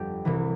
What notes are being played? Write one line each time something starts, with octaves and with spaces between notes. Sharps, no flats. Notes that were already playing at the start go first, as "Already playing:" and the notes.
Already playing: G1 F2 G4 A4
C2 C3 E3